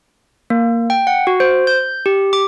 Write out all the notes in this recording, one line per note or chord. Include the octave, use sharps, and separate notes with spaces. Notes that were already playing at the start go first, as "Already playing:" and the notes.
A#3
G5
F#5
F#4
C5
G6
G4
D6